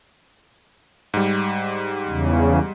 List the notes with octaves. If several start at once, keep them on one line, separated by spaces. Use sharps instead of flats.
G#2 G3
E2 C#3